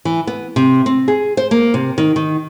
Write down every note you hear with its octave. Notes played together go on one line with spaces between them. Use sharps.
E3
B3
C3
C4
G#4
C5
A#3
C3
D#3
D#3